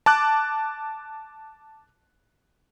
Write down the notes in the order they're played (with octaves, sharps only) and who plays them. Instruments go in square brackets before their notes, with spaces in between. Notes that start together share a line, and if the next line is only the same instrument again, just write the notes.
[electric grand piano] A5 D6 F#6